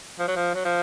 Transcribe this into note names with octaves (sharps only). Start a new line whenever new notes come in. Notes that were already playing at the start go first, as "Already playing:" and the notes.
F3
F#3
F3
F#3
F3